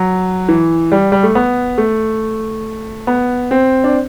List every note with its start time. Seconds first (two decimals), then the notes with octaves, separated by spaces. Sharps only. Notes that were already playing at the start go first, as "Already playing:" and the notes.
Already playing: F#3
0.49 E3
0.92 G3
1.12 G3
1.23 A3
1.35 B3
1.78 A3
3.07 B3
3.51 C4
3.84 D4